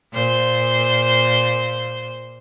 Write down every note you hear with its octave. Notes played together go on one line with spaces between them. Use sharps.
A#2 C5